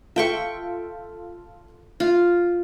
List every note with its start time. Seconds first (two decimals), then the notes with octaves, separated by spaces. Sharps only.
0.16 F4 A4 E5 G5 C#6
2.00 F4